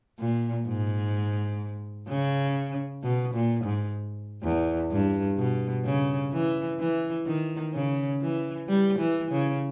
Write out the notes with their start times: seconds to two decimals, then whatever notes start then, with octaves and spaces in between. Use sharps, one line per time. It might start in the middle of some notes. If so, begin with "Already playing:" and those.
0.19 A#2
0.67 G#2
2.08 C#3
3.03 B2
3.34 A#2
3.65 G#2
4.43 E2
4.91 G2
5.38 B2
5.85 C#3
6.33 E3
6.79 E3
7.26 D#3
7.73 C#3
8.21 E3
8.69 G3
8.99 E3
9.31 C#3